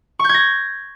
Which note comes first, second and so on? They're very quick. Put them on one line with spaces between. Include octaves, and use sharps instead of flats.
C#6 G6 G#6 A#6